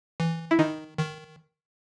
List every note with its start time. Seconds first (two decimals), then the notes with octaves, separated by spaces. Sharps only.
0.20 E3
0.51 E4
0.59 D#3 D#4
0.99 D#3